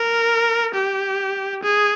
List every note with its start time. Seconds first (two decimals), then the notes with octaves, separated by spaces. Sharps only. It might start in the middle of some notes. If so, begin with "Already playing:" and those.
Already playing: A#4
0.74 G4
1.63 G#4